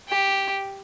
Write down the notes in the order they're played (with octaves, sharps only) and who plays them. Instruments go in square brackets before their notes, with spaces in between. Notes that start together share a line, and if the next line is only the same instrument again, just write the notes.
[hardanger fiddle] G4